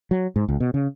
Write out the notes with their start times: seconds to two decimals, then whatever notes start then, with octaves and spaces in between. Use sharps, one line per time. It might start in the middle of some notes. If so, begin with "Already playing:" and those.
0.11 F#3
0.36 G#2
0.48 C#2
0.60 B2
0.74 C#3